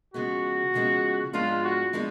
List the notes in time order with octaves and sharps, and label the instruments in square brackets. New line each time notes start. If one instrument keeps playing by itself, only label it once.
[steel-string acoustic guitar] C#3 F3 G#3 B3 [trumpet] F#4
[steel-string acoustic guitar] C#3 F3 G#3 B3
[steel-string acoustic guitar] G#2 F3 G#3 B3 D4 [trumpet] F4
[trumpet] F#4
[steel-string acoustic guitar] F3 G#3 B3 D4